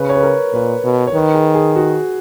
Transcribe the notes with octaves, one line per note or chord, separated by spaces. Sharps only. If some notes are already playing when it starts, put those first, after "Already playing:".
Already playing: C#3 B4
C#5
B4
A#4
A#2 B4
B2
C#5
D#3 B4
G#4
G#4
F#4